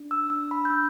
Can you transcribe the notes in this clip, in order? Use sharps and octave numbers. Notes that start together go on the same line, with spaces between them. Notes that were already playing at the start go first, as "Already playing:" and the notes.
Already playing: D4
E6
D4 E6
B5
G6
D4 E6